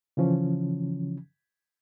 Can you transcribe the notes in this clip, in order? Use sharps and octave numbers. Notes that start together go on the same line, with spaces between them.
C#3 E3 F3 C#4